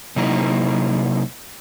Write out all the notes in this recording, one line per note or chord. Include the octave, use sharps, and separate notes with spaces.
C3 F#3 A#3 D#4 E4 A#5